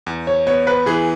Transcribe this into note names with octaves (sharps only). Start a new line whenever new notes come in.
E2
C#5
B3 C#5
B4
E3 G#4